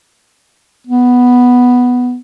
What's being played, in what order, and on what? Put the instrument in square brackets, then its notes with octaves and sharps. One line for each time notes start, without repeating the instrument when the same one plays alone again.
[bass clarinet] B3